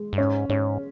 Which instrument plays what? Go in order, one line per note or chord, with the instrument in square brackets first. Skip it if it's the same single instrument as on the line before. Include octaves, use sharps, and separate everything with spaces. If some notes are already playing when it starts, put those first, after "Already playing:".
Already playing: [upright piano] G#3
[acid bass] G2
[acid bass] G#2 [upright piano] C#4
[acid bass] G#2 [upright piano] C#4